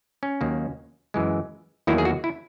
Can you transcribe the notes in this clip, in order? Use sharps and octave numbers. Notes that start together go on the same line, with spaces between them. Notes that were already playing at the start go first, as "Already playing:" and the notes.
C#4
D#2 D#3 F#3 A#3
F#2 E3 G#3
E2 D#3 F#3 A#3 E4
G#4
F#4
E4